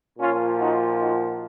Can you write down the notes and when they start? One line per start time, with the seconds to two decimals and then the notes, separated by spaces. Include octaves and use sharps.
0.19 A#2 F3 C#4 F4
0.59 D#4 F#4
1.01 D#4 F#4